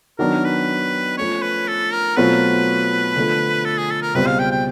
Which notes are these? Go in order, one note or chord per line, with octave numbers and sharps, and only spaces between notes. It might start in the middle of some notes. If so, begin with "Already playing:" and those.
D#3 F#3 B3 D4 A#4
B4
F3 A3 C#4 C#5
B4
A4
A#4
B2 F#3 A3 C4 F4 B4
D3 F3 A3
A4
G#4
A4
A#4
C#2 B2 G3 C4 B4
F5
G5
G5